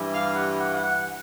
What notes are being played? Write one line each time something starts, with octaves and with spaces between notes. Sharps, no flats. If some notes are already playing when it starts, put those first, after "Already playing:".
Already playing: G2 E3 G3
F5
F#5
F#5
F#5